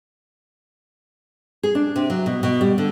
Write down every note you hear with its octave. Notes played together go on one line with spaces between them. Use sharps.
G#4
D4
C3
F#3
B2
B2
G3
D3